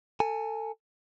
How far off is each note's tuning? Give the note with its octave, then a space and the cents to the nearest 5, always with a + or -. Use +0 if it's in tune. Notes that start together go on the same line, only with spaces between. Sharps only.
A4 +25 G#5 +0